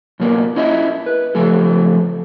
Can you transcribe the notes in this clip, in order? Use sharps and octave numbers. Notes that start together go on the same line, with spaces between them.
F#2 B2 A#3 B3
C#4 E4 D#5 E5
B4
C#3 F3 A3 A4